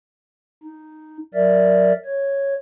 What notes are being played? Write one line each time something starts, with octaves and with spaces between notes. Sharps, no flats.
D#4
F#3 A#4 D5 E5
C#5